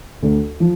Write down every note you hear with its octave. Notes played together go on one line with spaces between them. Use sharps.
D2
F3